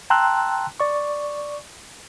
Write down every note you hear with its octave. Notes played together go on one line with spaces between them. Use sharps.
G5 A5 A#5 C6 E6 F#6
D5 C#6